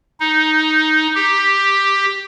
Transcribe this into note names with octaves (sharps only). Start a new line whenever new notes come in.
D#4
G4